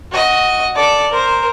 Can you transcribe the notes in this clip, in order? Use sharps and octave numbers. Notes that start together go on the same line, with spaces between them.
F#4 D#5
A4 D5
A#4 C5